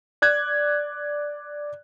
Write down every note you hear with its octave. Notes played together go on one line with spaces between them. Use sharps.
D5 F#6 G#6